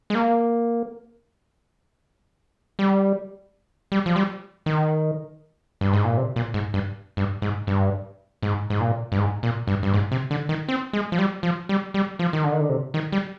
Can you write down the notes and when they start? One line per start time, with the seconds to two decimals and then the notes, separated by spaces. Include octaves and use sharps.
0.10 G#3
0.15 A#3
2.79 G3
3.92 G3
4.06 F3
4.16 G3
4.66 D#3
5.81 G2
5.93 G#2
6.05 A#2
6.17 C3
6.36 A#2
6.54 G#2
6.74 G2
7.17 G2
7.42 G#2
7.67 G2
8.43 G#2
8.70 G#2
8.80 A#2
9.12 G2
9.18 G#2
9.43 A#2
9.67 G2
9.83 G2
9.94 G#2
10.11 C3
10.31 D3
10.49 D#3
10.68 C4
10.93 G#3
11.12 F3
11.19 G3
11.43 F3
11.69 G3
11.94 G3
12.19 F3
12.33 D#3
12.44 D3
12.52 D#3
12.61 D3
12.69 C3
12.94 D#3
13.12 G3